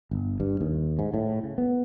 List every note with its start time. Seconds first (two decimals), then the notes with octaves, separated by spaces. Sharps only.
0.11 G1
0.40 G2
0.60 D#2
0.99 G#2
1.14 A2
1.44 C#3
1.58 B3